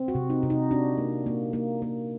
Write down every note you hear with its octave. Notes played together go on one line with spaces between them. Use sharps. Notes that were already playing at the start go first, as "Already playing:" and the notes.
Already playing: C4
F#4
C3
D#4
C3
D#4
D4 F#4
A#3
A#3
A#3
A#3